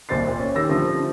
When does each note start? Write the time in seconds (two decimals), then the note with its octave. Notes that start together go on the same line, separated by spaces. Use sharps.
0.09 D#1 C2 C4 C5 A6 C7
0.26 A#2
0.39 C#4
0.55 D#3 G4 E6 A#6
0.69 D3 F3 G3 A3 C4